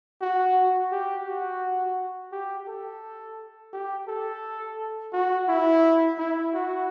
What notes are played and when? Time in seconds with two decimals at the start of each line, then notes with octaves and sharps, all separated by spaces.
0.22 F#4
0.92 G4
1.27 F#4
2.32 G4
2.68 A4
3.73 G4
4.08 A4
5.13 F#4
5.48 E4
6.18 E4
6.54 F#4